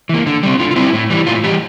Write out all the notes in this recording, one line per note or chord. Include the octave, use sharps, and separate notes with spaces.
E3 A#3
D3
G3 C4
D3 F4
F4
G3 C4 E4
A2
E3 G3
A2 F4
E3 G3 G4